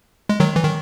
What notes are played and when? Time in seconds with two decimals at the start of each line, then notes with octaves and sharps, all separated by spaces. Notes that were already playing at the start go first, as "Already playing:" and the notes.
0.29 G#3
0.40 D#3 F#3
0.56 E3
0.64 D#3